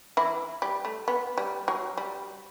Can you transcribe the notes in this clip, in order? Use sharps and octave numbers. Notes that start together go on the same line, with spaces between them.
E3 E4
G3
A3
B3
G3
F#3
G3